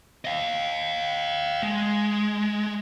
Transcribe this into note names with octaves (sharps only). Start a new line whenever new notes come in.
D#5 F5
G#3